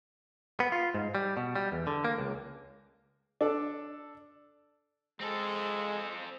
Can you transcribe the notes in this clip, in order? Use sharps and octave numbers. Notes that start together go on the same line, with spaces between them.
B3
F4
G#2
G3
B2
G3
E2
D3
A#3
C#2
D4 A4
G#3 C4 A4